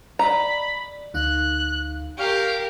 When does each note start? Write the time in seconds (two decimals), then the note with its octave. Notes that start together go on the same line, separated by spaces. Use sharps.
0.19 D5 D#5 A#5 B5
1.14 D2 D#4 F5 F#6
2.18 G4 A#4 F5 C#6